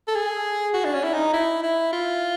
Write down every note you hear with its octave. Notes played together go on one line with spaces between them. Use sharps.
A4
G#4
F#4
D4
C#4
E4
D#4
E4
E4
F4